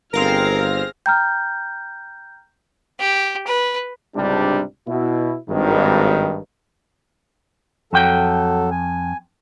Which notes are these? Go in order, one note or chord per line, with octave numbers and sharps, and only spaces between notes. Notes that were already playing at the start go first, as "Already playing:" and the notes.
G1 C4 G#4 A#4 F5 F6 A#6
G5 A#5 F6 G6
G4
B4
C#2 G#2 C3 G3 D4
B2 E4
G#1 G2 D#3
F2 F#3 A4 G5
G#5